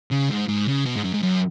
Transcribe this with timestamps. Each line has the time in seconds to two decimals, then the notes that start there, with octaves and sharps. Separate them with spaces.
0.12 C#3
0.30 G#2
0.49 G#2
0.68 C#3
0.86 B2
0.96 G#2
1.05 F#2
1.14 G#2
1.23 F#2